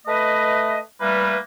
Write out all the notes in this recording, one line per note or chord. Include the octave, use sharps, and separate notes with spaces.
A3 B4 D#5
E3 G3 A3 A#3 B4